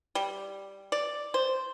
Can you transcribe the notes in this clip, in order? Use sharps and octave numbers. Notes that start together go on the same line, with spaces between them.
G3
D5
C5